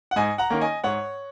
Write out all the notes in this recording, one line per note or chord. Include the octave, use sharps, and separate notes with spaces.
F#5
G#2 D#5 G#5
F#5 A#5
D#3 A#3 C#4
D#5 G#5
G#2 C#5 F#5